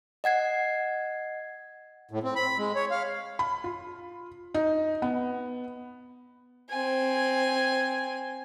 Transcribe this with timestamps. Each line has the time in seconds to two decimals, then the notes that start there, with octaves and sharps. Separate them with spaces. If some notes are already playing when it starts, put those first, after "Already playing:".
0.24 D#5 F#5 G#6 C7
2.11 A2
2.23 C4
2.36 B5
2.58 G#3
2.75 C#5
2.91 F5
3.39 B5
3.64 F4
4.55 D#4
5.02 B3
6.70 C4 G#5